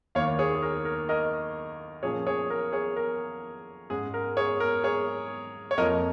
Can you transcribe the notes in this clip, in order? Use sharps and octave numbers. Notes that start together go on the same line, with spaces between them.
D#2 D#3 A#3 C#5 F5
G#4 C#5
G#4
A#4
A#4
A#4 D#5
A#2 F3 A#3 C#4 G#4 C#5
G#4 C#5
A#4
G#4 C#5
A#4
G#2 G#3 C#4 G#4
A#4
G#4 C#5
A#4
G#4 C#5
C#5
F2 F3 A#3 A#4 D#5